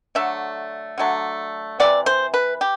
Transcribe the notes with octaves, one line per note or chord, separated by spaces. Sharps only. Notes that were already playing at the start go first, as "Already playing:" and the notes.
D3 F#3 A3 E5
D3 F#3 A3
C3 E3 B3 D5
C5
B4
G4